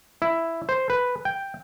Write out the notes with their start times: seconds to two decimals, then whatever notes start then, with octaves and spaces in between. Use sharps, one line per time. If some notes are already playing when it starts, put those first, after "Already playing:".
0.22 E4
0.69 C5
0.90 B4
1.25 G5